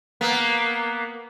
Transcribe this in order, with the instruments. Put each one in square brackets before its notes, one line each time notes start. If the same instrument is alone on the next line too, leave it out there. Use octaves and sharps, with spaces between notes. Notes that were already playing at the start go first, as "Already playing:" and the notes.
[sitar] A#3 B3